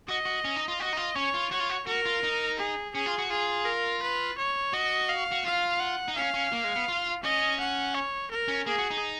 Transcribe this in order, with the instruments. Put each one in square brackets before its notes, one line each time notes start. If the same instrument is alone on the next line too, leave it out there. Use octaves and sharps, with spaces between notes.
[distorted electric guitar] F#4 [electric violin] D#5
[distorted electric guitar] F#4
C#4
D#4
F4
[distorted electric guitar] F#4 [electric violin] D#5
[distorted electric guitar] D#4
F4
[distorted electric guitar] C#4 [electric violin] C#5
[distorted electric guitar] F4
[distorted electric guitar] F#4 [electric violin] C#5
[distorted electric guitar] F4
F#4
[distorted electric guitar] F#4 [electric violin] A#4
[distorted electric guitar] F4
D#4
[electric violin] G#4
[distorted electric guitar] C#4 [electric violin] G#4
[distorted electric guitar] F4
F#4
[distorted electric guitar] F4 [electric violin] G#4
[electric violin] A#4
B4
C#5
[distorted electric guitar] F#4 [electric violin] D#5
[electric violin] F5
[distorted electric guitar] F#4
[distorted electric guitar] F4 [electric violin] F5
[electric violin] F#5
[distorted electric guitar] D#4
[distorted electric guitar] C#4 [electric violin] F5
[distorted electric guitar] C#4
A#3
G#3
B3
F4
[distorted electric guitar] C#4 [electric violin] D#5
[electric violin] F#5
C#5
A#4
[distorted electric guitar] C#4
[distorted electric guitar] A#3 [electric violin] G#4
[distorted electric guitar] F#4
D#4